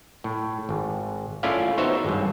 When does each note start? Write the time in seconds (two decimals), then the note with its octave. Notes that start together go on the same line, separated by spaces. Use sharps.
0.24 A2
0.69 G#1
1.43 A3 C#4 E4 F4 D5 F5
1.78 B3 D#4 F#4 C5 C#5 E5
2.05 G#1 G2